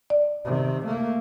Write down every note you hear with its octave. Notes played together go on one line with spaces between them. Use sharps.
D5
C3 D#3
A3 A#3